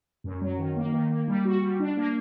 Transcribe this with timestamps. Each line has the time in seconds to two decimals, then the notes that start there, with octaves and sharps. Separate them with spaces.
0.24 F#2
0.42 F#3
0.58 D#3
0.76 A#3
0.93 D#3
1.10 A#3
1.28 G3
1.45 F#4
1.62 G3
1.80 D4
1.97 A#3